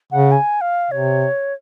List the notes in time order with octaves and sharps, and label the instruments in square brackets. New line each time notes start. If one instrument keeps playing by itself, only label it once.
[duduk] C#3 [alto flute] F#5
[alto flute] G#5
F5
[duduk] C3 [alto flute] C#5